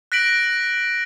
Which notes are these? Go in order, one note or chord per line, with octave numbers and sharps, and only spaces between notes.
F#6 A#6 B6 D7 F#7